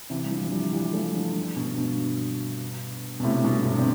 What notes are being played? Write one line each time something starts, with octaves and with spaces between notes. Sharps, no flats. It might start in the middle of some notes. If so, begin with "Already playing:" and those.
C3 E3
G3
D3 F3
F3
E3 G3
E3 G3
G3
F3 A3
D3 F3
B2 D3
G2 B2
B2
A2 C3
G2 B2
B2 D3
C4